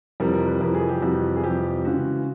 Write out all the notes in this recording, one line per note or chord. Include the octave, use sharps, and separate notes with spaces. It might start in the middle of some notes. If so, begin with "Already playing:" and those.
F2 C3 E3 G3 A#4
A#4
B4
F2 C3 E3 G3 A#4
G#4
G4
F2 C3 E3 G3 F#4
G#4
F2 C3 E3 G3 G4
C#3 E3 G#3 F#4